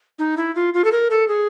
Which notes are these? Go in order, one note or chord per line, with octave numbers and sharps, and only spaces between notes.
D#4
E4
F4
F4
A4
A#4
A4
G#4